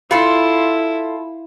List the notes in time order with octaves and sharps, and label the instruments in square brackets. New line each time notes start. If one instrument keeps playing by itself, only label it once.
[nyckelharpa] E4 [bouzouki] F4 A4 [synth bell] F5 B5